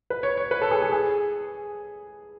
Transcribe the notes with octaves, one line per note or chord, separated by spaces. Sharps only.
B4
C#5
C#5
B4
A4
G#4
G#4
G#4